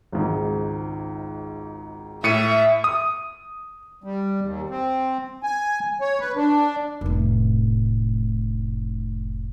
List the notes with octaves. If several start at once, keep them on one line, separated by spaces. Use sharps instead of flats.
G#1 C#2 G#2
A2 E5 C#7 D#7
D#6
G3
D#2
C4
G#5
C#5
B4
D4
F1 A2